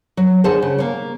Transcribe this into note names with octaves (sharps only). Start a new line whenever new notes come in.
F#3
D3 G#4 C5 C#5 F#5 A5
C#3
A#3 C#5